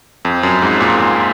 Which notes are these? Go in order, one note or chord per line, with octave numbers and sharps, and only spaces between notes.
F2
F#2
G#2
A#2
A#2